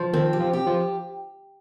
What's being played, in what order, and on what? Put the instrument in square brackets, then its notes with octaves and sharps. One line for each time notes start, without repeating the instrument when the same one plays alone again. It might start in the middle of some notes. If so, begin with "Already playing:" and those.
Already playing: [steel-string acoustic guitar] F3
[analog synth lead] D#3 [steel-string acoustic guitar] C4
[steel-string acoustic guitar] G4
[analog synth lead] F3
[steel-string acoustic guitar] G4
[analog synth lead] F3